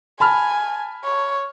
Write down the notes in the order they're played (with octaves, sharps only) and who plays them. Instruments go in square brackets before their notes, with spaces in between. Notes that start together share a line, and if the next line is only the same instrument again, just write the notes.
[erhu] G#5 [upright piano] A5 B5 F6
[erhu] C#5